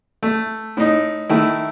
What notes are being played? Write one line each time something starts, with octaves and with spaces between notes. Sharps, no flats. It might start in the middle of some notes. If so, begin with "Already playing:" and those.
A3
A2 D#4
D#3 A3 E4